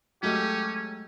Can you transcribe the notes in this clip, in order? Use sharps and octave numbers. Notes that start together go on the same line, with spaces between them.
F#3 G#3 A3 C#4 G4